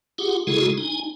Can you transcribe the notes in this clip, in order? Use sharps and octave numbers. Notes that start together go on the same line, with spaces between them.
F4 G4 G#4 F#5
C#3 G#3 E4 F#4 G#4 A4
D#4 G#5